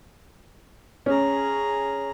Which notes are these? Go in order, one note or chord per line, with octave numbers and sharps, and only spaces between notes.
C#4 G#4 A#5